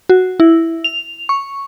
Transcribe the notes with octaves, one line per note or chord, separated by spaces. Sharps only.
F#4
E4
F7
C#6